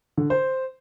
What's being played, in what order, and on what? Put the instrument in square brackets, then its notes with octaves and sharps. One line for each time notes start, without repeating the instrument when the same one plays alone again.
[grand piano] D3
C5